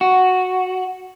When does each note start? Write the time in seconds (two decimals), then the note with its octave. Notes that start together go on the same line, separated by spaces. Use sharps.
0.01 F#4